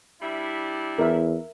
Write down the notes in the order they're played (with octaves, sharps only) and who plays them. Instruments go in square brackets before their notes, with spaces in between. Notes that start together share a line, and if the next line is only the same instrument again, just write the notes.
[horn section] G3 D4 E4
[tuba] E2 [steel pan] A#4 E5